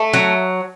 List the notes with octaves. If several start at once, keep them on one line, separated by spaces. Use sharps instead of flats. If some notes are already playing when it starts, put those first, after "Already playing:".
Already playing: A3
F#3